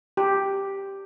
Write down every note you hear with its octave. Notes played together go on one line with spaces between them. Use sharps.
G4